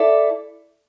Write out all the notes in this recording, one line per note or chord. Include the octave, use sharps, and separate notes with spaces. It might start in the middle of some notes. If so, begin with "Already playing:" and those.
Already playing: E4 A4 D5